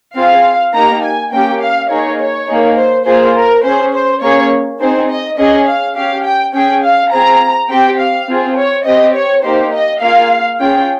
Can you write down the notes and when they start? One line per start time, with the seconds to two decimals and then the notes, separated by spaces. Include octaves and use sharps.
0.15 C4 F4 G#4 F5
0.74 A#3 D#4 G4 A#5
1.03 G#5
1.31 A#3 C#4 G4 G5
1.61 F5
1.90 A#3 D#4 G#4 C#5
2.19 C#5
2.48 A#3 D#4 G#4
2.76 C5
3.05 A#3 F4 G#4 C5
3.35 A#4
3.63 C#4 G#4 C5
3.93 C5
4.21 A#3 C#4 G#4 C#5
4.80 C4 D#4 G#4 C5
5.09 D#5
5.37 C#4 G#4 D#5
5.67 F5
5.96 C#4 G4 F5
6.24 G5
6.53 C#4 G#4 G5
6.83 F5
7.12 C4 F4 G#4 A#5
7.69 C4 G4 G5
7.98 F5
8.27 C4 F4 G#4
8.56 C#5
8.85 C4 G4 D#5
9.14 C#5
9.43 A#3 D#4 G4 C5
9.72 D#5
10.01 A#3 F4 G#4 F5
10.59 C#4 F4 G#4 G5